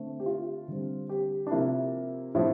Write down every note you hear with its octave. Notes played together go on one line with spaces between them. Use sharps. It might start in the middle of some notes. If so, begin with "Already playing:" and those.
Already playing: D3 A3 C4
G4
F4
D3 G3 C4
G4
D4
C3 F3 A#3 E4
A2 F3 C4 E4